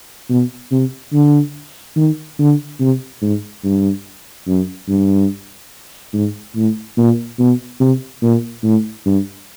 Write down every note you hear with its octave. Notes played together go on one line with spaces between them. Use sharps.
B2
C3
D3
D#3
D3
C3
G#2
G2
F#2
G2
G#2
A2
A#2
B2
C3
A#2
A2
G2